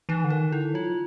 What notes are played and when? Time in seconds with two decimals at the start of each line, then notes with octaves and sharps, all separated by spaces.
0.09 E3 D#4
0.24 D3
0.30 D#3 D#4
0.52 D3 E4
0.74 F#3 F4